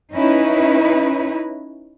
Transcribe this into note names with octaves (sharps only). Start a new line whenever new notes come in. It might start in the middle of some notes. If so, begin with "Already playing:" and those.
C#4 D#4 E4 B4